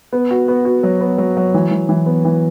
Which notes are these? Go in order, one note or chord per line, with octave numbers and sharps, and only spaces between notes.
B3
F#4
B3
F#4
F#3
B3
F#3
F#3
E3
E3
E3
B3
E3